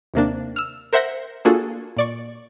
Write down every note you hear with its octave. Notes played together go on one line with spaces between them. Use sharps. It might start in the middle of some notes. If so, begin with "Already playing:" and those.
D#2 C3 A#3 D4
E6 F6
A#4 C5 E5 F#5 G6 A#6
A#3 D4 F4 F#4 G#4 A4
A#2 D5 C#6